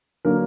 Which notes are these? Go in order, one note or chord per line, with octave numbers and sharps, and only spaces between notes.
D3 F#3 A#3 A#4